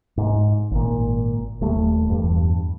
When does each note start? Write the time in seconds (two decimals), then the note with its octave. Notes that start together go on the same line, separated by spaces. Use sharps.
0.17 G#2
0.71 G#1 A#2
1.61 D#1 G3 A3
2.10 E2 G2